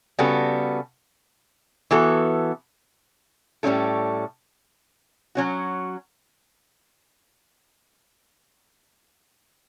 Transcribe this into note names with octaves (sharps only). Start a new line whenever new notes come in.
C#3 G3 B3 F#4 A4
E3 B3 F#4 A4
A2 G3 C#4 E4 A4
F#3 C#4 F#4